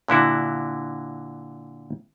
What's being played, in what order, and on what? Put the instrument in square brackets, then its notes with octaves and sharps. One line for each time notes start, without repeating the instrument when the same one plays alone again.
[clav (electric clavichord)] A#2 D3 E4 F#4